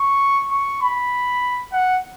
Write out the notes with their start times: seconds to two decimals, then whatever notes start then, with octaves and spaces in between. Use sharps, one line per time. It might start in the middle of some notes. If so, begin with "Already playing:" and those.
Already playing: C#6
0.51 C#6
0.82 B5
1.73 F#5